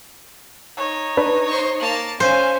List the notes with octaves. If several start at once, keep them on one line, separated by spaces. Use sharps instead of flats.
D#4 C#5
D4 B4
C5 C#6
A#3 A5
C#4 C5 F5 G#5